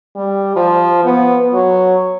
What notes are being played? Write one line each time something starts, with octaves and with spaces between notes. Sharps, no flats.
G3
F3
B3
F#3